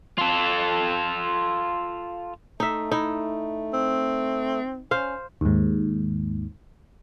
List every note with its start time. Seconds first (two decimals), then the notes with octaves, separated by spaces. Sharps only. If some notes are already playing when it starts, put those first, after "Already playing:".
0.18 F4 A4
2.60 A3 D#4 E5
2.92 D#4 E4
3.73 C4
4.91 C#4 C5 F5
5.41 D#2 G#2